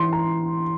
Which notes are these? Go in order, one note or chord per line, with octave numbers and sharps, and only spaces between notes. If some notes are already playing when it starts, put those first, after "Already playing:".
Already playing: E3 C6
A#5